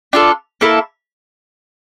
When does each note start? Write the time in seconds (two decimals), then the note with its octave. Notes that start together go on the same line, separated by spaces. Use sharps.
0.13 D4 F4 A4
0.61 A#3 E4 A4